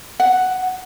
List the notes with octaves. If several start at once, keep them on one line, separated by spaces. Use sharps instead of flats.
F#5